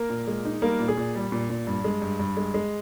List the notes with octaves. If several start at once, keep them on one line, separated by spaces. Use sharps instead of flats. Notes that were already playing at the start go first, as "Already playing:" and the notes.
Already playing: A#3 A#4
A#2
G#3
D#4
G3 A#3 A#4
A#2
G#4
A#2
G3
A#2
A#2
G2
G#3
G2
G2
G#3
G#3